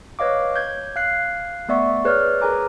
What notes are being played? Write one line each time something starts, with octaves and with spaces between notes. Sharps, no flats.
B4 C#5 D#5 F5 D6
G6 G#6
F5 F#6 C7
A3 B3 D5 E5 C#6
G#4 B4 C#5 D5 F6
G#4 A#4 B4 G#5 A#5 D6